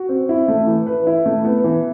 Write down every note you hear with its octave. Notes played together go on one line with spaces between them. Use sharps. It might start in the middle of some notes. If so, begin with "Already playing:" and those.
Already playing: F#4
C4
E4
A3
E3
B4
E4
A3
B3
E3